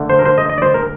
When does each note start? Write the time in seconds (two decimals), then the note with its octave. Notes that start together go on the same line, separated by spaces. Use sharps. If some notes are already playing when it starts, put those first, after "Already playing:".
Already playing: D3 A3 D4
0.10 C5
0.19 A#4
0.25 C5
0.38 D#5
0.50 D#5
0.58 D5
0.62 C5
0.74 A#4